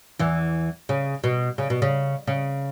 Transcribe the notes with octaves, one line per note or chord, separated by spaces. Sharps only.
E2 E3
C#3
B2
C#3
B2
C#3
C#3